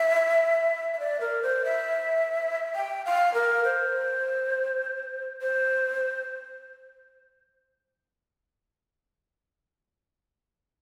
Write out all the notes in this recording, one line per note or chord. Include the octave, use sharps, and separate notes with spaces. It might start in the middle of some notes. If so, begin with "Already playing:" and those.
Already playing: E5
E5
D5
A#4
C5
E5
G5
F5
A#4
C5
C5